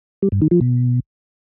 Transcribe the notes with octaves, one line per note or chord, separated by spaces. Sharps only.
G3
G2
D#3
F3
B2